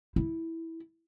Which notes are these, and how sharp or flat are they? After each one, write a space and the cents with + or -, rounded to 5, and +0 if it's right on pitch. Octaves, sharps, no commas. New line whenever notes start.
E4 -10